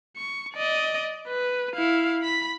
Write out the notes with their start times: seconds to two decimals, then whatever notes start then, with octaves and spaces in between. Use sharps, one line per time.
0.17 C#6
0.54 D5 D#5
1.28 B4
1.75 E4 F5
2.22 B5 B6